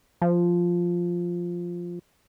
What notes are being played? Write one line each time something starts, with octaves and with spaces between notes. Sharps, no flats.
F3